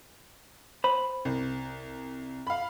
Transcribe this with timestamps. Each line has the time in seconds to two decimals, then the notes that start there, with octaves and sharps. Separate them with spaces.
0.84 C5 B5
1.25 C2
2.47 F5 B5